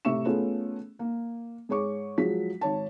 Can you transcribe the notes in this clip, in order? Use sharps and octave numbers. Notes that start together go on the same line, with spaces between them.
A2 C3 E5 C#6 E7
A3 B3 C#4 F4 G#4
A#3
G#2 G#4 C#5 C#6 D6
F3 F#3 G#3 B6
G#1 C#5 A5